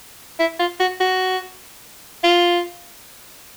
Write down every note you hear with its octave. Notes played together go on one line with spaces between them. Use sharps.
E4
F4
F#4
F#4
F4